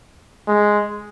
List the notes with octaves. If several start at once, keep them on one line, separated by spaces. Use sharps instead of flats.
G#3